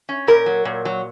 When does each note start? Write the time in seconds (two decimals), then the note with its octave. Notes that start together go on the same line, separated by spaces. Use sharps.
0.09 C#4
0.27 A#2 A#4
0.46 F#3
0.65 A#2
0.85 F#3